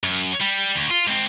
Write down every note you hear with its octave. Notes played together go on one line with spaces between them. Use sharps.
F#2
G3
D2
F4
G#2 C4